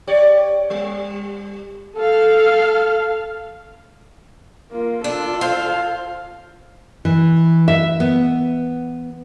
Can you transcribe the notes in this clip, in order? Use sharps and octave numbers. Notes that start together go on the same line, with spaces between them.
G4 C#5 D5
G3
A4 F5
A#3 F4
D4 F4 A4
C5 F5
E3
E5
B3